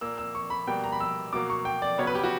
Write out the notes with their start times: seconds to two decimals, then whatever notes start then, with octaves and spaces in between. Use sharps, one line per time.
0.01 A#2 A#3 E6
0.18 E6
0.35 C#6
0.50 B5
0.67 B2 G3 A#3 G5
0.84 A#5
0.92 B5
1.00 E6
1.33 B2 F#3 A#3 D6
1.50 C#6
1.65 G5
1.82 D5
1.98 C#3 F#3 B3 C#5
2.07 B4
2.15 G4
2.24 F#4